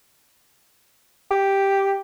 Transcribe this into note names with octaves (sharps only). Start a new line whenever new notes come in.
G4